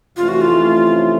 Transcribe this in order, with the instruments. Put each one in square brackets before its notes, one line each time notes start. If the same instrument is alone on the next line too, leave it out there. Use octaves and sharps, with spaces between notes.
[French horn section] F2 C3 E3 A3 C#4 [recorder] F4
[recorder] F#4
F4